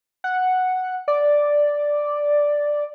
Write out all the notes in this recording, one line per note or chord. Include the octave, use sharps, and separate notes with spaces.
F#5
D5